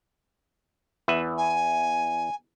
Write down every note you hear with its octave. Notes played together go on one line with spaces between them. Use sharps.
E2 B4 E5
G#5